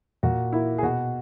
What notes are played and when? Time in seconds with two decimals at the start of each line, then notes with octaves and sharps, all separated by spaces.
0.23 A#2 F#4
0.53 A#3 E4
0.78 G#4
0.83 B2 F#4